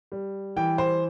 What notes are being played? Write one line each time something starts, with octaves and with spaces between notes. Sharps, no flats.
G3
E3 G5
C5